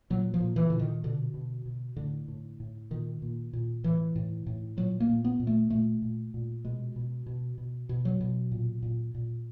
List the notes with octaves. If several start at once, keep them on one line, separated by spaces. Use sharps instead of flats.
A#2 F#3
F3
A#2
E3
A#2 D3
D#3
B2 D3
B2
B2
A2 D3
A2
A2
A#2 D#3
A#2
A#2
A2 E3
A2
A2
A#2 F#3
A#3
A#2
B3
A#2
A3
A#2 A3
A#2
A#2
B2 G#3
B2
B2
B2
B2
F#3
B2
A#2
A#2
A#2